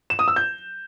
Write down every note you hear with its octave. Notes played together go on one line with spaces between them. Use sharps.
E7
D#6
E6
G6